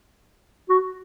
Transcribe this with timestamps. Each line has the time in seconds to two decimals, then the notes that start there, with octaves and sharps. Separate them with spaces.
0.69 F#4